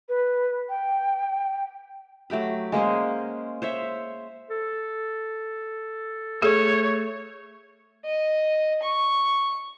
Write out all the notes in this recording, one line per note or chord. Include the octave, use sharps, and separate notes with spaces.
B4
G5
F#3 A3 G4 B5
G#3 A#3 C#4 C5
C5 C#5 E5
A4
A3 G#4 A4 C#5
D#5
C#6